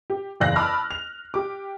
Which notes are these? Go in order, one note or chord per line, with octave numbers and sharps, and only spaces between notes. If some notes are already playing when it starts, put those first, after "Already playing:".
G4
F#1 E2 D5 F5 F#6 A#6
A5 B5 D6 E6 F6
F7
G4 D6